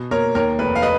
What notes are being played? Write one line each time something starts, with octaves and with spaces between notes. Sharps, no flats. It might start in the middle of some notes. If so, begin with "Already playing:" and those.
Already playing: B2
A#3 A#4 C#5
D#2 A#4 C#5
F1 B4
F5
B4 D#5